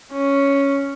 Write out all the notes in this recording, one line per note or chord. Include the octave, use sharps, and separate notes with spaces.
C#4